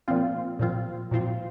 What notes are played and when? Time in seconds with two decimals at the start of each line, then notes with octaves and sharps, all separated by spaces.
0.08 A#2 F3 C4 F4
0.59 A#2 F3 C4 F4
1.11 A#2 F3 C4 F4